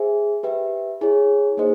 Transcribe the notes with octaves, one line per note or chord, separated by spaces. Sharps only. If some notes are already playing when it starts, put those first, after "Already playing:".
Already playing: G#4 C5 E5 G#5
G4 B4 E5 G5
E4 G#4 C#5
A#3 D#4 G#4 C5 D#5